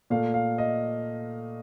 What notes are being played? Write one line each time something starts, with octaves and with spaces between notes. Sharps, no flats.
A#2 A3 F5
F5
D#5